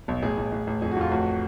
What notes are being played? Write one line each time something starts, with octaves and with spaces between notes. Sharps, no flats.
B1
A1 G#4
A1
A1
A1
F2 G#4
F#4
F2 F4
A1 F#4